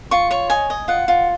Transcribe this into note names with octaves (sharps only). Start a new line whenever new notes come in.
F4 C#6
C#5 C#6
D#5 G#5
D#5
F4 F#5
F4